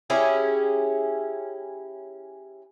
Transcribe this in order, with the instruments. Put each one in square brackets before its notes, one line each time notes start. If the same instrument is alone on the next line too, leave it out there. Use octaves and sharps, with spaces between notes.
[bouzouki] C#4 E4 G4 G#4